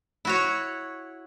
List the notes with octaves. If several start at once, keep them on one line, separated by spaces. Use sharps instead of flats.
E4 F#4 C#5